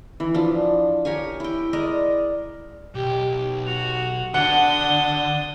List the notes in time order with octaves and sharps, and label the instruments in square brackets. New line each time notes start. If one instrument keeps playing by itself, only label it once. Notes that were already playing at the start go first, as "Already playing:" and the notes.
[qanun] E3
F3 D4
G4 A#4 C#5 G#5
E4 G5
G#3 A#4 D5 D#5
[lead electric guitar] B1 [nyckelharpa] G4
[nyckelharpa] F#4 [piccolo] F7
[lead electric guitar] D3 [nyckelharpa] D4 D#6 [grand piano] F#5 [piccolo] G7